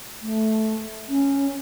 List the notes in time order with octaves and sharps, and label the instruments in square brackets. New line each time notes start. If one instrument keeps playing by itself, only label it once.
[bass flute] A3
C#4